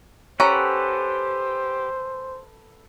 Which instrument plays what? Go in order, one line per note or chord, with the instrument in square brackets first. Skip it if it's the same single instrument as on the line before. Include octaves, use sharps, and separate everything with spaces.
[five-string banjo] C#4 A#5 [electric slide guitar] G4 [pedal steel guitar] A4 B4 F#5 [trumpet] C5